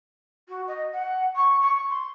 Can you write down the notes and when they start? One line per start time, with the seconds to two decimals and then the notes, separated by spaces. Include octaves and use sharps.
0.48 F#4
0.67 D#5
0.92 F#5
1.35 C#6
1.61 C#6
1.90 C6